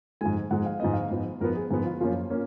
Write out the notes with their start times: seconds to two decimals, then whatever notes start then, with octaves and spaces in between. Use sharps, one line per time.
0.21 G#2 F3 G#3 G#5
0.51 G#2 F3 G#3 F#5
0.66 F5
0.80 G#2 F3 B3 D#5
0.93 F5
1.11 G#2 F3 B3
1.41 G#2 F3 B3 A#4
1.56 G#4
1.71 G#2 F3 B3
1.86 F4
2.01 F#2 F3 A#3 C#4 F4
2.30 A#3 C#4